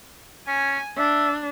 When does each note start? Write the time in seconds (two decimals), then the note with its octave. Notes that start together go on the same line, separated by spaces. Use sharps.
0.48 C#4 G#5
0.97 D4 E5